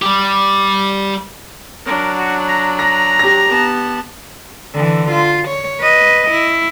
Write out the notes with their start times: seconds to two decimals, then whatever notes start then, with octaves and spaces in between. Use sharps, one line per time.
0.02 G3 G4
1.86 F#3 D4 A#4
2.18 F#4
2.47 A#5
2.79 A#5 A#6
3.19 G4 A#6
3.49 B3 A5
4.75 D3 E3
5.11 F4
5.48 C#5
5.81 B4 D#5
6.31 E4